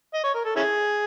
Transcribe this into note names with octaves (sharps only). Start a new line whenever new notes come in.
D#5
C#5
A#4
A4
C#4 E4 G#4